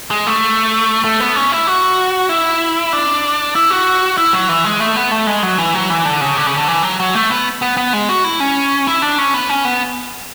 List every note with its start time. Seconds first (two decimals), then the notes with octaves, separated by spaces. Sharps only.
0.11 G#3
0.27 A3
1.04 A3
1.20 B3
1.36 C#4
1.52 E4
1.67 F#4
2.29 E4
2.93 D4
3.55 E4
3.71 F#4
4.18 E4
4.33 F#3
4.49 E3
4.65 G#3
4.80 A3
4.96 B3
5.11 A3
5.27 G#3
5.43 F#3
5.58 E3
5.74 F#3
5.90 E3
6.05 D3
6.20 C#3
6.37 D3
6.46 C#3
6.58 D3
6.68 E3
6.83 F#3
7.00 F#3
7.15 A3
7.30 B3
7.62 B3
7.77 B3
7.93 G#3
8.09 F#4
8.24 E4
8.40 C#4
8.87 E4
9.02 D4
9.18 C#4
9.34 B3
9.49 C#4
9.65 B3